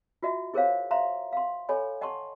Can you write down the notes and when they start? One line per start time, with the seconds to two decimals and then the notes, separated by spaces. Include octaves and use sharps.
0.23 F4 F#4 D#5 E5
0.54 E4 G#4 A#4 C5 C#5 F5
0.91 E5 F5 A#5 C6
1.33 F5 C6
1.69 A4 C#5 D#5 G#5 B5
2.01 D#5 F#5 A5 C6 C#6